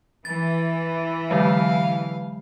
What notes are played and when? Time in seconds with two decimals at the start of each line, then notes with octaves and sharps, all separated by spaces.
0.25 E3 A6
1.31 D3 F#3 G#3 F5